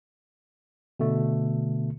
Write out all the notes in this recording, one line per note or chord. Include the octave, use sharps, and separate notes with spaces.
B2 D3 A3